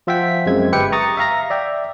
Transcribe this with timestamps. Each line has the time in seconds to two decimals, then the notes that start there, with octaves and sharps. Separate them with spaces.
0.07 F3 F4 E5 F#5 G5 B6
0.46 F#2 G#3 C4 G#6
0.72 G1 G4 B4 E5 G5 C#7
0.92 A#5 C#6 D#6 A6
1.17 E5 F5 A#5 A#6
1.50 D5 E5 G5